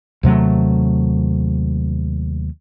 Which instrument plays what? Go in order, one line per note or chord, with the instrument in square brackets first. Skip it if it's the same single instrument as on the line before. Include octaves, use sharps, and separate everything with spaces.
[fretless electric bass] D#2 C3 F#3 A3